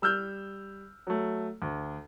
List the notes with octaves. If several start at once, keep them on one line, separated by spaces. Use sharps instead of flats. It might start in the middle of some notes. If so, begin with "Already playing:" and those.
G3 E6 F6 G6
F#3 A3
D2